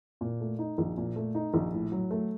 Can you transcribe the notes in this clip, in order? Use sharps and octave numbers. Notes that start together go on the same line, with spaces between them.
A#2
A3
D#4
A#1
A#2
A3
D#4
A#1
A2
F#3
A3